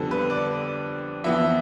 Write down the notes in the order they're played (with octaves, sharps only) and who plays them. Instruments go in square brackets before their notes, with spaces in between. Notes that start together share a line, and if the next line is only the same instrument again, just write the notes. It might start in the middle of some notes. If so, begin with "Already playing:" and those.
Already playing: [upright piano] F2 D3 G3 B3 A4
B4
D5
F2 E3 B3 E5